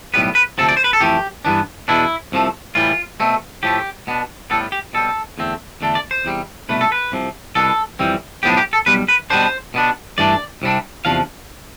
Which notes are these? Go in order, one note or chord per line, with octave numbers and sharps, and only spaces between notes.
B1 A2 G3 B3 B4
B4
D2 C3 F3 C4 A4
D5
C5
B4
A4
F2 E3 A3 G4
G2 E3 B3 D4
E2 B2 B3 D4 E4
C2 C3 F3 A3
A2 E3 G3 F4
B2 A3 C4
A2 F3 A3 G4
B2 B3 D4
A2 G3 B3 A4
G4
B2 G3 C4 A4
E2 D3 A3 C4
E2 D3 A3 D4
D5
C5
E2 C3 G3
C2 B2 A3 D4 B4
A4
B4
C2 C3 F3
C2 B2 B3 D4 A4
F2 E3 G3 C4
B1 A2 F3 B3 D4 G4
G4
A4
B1 B2 G3 B4
B4
B2 G3 B3 D4 C5
B2 B3 D4
G2 E3 A3 D4 D5
C2 C3 G3 D4
E2 C3 F3 D4 F5